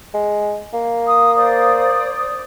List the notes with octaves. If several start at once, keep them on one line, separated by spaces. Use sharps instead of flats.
G#3
A#3
D#6
C5 D5 D#6